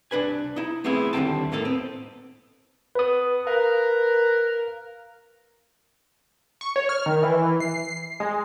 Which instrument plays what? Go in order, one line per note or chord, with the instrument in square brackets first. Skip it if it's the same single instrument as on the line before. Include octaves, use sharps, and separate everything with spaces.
[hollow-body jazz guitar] C2 D4 B4 G#5
D#4 E4
A3 B3 C4 E4 G#4
D#2 D3 G3 C4 G5 A5
A2 A#3 D#4 A4
B3 C4
[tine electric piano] B4 D#6
[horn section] A#4 [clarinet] B4 [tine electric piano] F5
[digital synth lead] C#6
C#5
F6
D#3
E3
C7
G#3